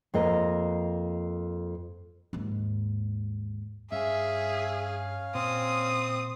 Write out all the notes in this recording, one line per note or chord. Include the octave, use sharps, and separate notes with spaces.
F2 A#3 D#5
D#2 G#2
G2 C#4 G#4 E5 F5 G#5
A#2 C4 D#6